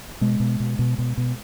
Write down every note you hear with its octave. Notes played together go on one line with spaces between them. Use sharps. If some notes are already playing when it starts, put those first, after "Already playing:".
B2 G#3
B2
B2
B2
B2
B2